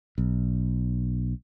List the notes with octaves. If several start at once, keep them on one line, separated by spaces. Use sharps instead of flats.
B1